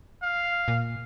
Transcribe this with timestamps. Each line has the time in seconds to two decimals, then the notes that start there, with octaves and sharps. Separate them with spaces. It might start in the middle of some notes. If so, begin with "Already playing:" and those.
0.23 F5
0.68 A#2